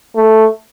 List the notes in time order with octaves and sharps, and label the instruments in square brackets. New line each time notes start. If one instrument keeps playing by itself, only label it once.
[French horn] A3